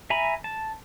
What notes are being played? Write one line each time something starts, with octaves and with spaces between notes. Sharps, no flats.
E5 G#5 A#5 B5
A5